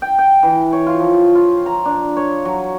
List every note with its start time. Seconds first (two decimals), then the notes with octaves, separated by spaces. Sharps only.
0.02 G5
0.18 G5
0.43 E3
0.73 C#5
0.87 F4
1.00 F3
1.35 F4
1.66 A#5
1.85 D4
2.17 C#5
2.45 F#3